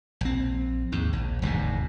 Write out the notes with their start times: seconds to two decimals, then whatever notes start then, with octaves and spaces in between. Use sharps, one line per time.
0.21 A#1 C4
0.92 D#2 G#2
1.13 A#1
1.42 E1 D2 G#2 B2